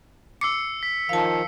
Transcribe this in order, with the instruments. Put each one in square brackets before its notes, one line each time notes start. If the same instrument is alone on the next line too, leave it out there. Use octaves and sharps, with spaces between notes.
[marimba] D6 [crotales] E6 C7 C#7
[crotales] B6
[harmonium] D#3 F3 [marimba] F5 A5